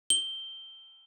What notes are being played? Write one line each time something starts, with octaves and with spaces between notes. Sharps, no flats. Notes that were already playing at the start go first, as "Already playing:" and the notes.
G7